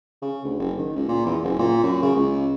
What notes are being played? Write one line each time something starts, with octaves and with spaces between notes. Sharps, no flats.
C#3
D2
F#1
D#3
C#2
A#2
E2
F#1
A#2
F#2
C#3
C#2